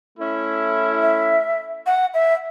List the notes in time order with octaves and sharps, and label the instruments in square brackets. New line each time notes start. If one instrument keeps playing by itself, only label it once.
[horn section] A3 C#4 E4
[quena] E5
F#5
E5